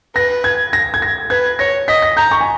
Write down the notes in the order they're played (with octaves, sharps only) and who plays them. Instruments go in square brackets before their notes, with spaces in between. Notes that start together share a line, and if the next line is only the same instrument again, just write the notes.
[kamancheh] B4 [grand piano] A#6
[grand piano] G#6
A#6
G#6
A#6
[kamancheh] B4 [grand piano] G#6
[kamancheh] C#5 [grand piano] A#6
[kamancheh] D#5 [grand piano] B6
[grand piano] A#6
[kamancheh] A#5 [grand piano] G6
[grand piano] C#6
G#5